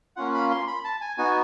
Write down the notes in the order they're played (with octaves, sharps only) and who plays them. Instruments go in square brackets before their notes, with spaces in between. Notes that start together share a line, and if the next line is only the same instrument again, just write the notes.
[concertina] A#3 C#4 F4 F#5
B5
C6
B5
A5
G#5
B3 D#4 F#4 G#5